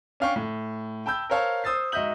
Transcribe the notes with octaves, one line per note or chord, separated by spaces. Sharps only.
C#4 D4 F5 G5 C#6
A2
G5 A5 B5 E6 G6
A#4 C5 C#5 F5 A5
C5 D#6 E6 A6 C7
G#2 F#4 D#5 E5 G6 F#7